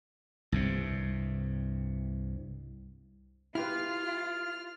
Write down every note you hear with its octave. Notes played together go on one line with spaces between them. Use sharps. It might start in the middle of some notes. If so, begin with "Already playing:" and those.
C2 G2 C3
E4 F4 G4 B4 F6